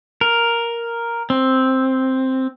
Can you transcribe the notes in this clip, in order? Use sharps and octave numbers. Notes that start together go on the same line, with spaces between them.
A#4
C4